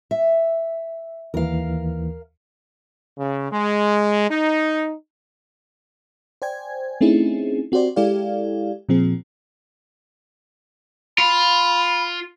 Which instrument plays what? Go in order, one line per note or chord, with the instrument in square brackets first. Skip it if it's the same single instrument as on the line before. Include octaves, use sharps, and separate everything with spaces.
[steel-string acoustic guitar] E5
[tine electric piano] D#2 E3 [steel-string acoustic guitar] A#4 F5
[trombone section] C#3
G#3
D#4
[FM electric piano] C5 D5 G5 G#5 G#6
A3 C4 C#4 D#4 E4 G#4
C4 F#4 G4 C5 D5
G#3 E4 G4 A4 D5 F5
A#2 F3 C4 G#4
[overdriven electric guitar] F4 [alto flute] B5